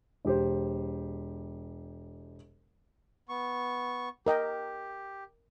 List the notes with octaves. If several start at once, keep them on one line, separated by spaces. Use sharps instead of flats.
E1 G4 C5
B3 C#6
G4 A#4 D#5 G5